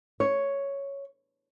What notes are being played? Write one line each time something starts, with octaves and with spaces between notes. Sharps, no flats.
C#5